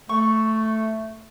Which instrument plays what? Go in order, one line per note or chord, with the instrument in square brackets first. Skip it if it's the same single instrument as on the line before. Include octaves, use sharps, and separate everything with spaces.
[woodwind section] A3 [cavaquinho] C#6